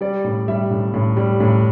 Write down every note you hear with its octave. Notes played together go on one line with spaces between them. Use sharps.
G3 D5
A2
G3 E5
A2
A2
G3
A2